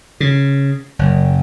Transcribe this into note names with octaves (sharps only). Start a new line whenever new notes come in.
C#3
F#1